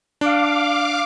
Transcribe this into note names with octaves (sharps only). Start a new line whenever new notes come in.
D4 F5 D6